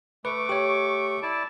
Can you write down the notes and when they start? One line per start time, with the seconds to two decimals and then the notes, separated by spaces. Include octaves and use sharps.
0.25 A3 B4 C#6 D6
0.49 G4 C#5
1.23 E4 D5 A5